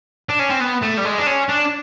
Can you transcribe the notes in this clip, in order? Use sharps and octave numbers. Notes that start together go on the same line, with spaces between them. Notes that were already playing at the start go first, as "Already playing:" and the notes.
D4
C#4
C4
B3
A3
G3
G#3
D4
C#4
D4